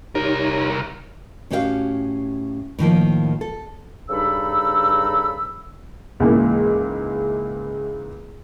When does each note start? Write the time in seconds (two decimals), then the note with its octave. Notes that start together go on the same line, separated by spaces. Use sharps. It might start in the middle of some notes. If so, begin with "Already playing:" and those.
0.15 C2 D#4 G4 A#4 C#5
1.50 A2 C#4 F#4 G4 C#5 F5
2.79 A2 D#3 F3 A#3
3.41 A4
4.09 G2 C#3 D#4 A4 B5 E6
6.20 C#2 G#2 E3 A#3